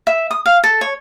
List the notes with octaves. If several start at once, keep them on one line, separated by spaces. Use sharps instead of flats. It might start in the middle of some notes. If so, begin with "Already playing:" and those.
E5
D#6
F5
A4
C#5